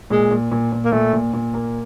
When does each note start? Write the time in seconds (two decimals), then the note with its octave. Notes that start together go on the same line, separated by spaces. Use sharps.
0.10 A#2 G#3
0.31 A#2
0.52 A#2
0.72 A#2
0.85 A#3
0.92 A#2 A3
1.13 A#2
1.33 A#2
1.54 A#3